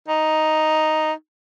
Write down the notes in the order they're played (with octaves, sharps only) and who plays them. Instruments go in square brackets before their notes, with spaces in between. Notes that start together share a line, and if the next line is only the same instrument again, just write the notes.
[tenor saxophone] D#4